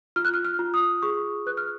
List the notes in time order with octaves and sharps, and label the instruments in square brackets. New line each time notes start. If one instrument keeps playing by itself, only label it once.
[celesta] F4 F6
F#6
F6
F6
F4
D#6
G#4 C#6
B4 F#6
F6